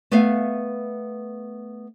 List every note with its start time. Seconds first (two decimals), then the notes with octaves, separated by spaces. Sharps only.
0.11 A3 B3 B4 E5 F5